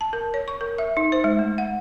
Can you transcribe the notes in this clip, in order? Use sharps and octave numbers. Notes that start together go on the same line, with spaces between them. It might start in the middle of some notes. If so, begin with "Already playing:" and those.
A5
A#4
C#5
C#6
A#4
E5
D#4
C5
G#3
A3
F#5